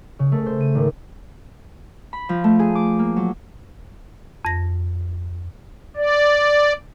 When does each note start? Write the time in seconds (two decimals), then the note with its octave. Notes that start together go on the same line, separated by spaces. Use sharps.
0.19 C#3
0.32 A3
0.46 C5
0.61 D#7
0.75 G#1
2.13 B5
2.29 F3
2.44 A3
2.59 G#4
2.75 D6
2.99 A#3
3.16 F#3
4.45 F2 A#6
5.96 D5